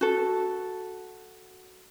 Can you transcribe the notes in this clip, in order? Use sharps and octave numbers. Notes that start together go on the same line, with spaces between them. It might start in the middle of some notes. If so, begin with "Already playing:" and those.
F#4 A4